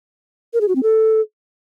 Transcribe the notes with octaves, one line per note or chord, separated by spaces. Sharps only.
A#4
G#4
F#4
C4
A4